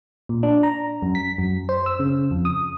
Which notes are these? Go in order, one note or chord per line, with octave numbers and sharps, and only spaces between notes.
A#2
D4
A#5
F#2
B6
F#2
C5
E6
C#3
F2
D#6